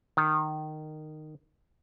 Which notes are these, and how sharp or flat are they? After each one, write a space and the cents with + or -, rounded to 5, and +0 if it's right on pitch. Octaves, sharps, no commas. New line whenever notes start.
D#3 -15